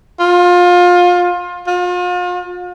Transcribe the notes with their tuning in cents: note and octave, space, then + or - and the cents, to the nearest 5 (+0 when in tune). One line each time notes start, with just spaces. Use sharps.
F4 +25
F4 +40